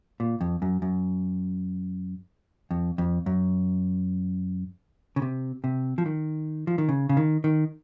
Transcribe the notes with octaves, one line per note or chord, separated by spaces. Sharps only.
A#2
F2
F#2
F#2
F2
F2
F#2
C#3
C3
C3
F3
D#3
F3
D#3
C#3
C#3
D#3
D#3